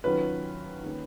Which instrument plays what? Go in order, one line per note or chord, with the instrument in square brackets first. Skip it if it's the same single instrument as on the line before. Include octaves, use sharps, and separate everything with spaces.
[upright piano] D#3 F#3 C#4 F4 [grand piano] B4
[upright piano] D#3 A#3 C#4